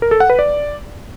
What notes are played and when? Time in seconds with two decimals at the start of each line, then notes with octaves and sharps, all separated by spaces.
0.02 A#4
0.11 A4
0.20 F#5
0.30 B4
0.39 D5